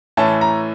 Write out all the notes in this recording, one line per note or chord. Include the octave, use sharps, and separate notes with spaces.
A2 E3 A3 C#4 A5
A#5